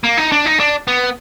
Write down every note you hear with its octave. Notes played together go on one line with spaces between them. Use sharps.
A#3
D#4
D4
D#4
D4
B3